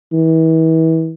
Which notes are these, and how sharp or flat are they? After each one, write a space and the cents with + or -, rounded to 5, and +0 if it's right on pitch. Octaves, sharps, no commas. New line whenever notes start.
E3 -35